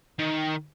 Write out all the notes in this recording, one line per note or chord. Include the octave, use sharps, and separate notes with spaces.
D#3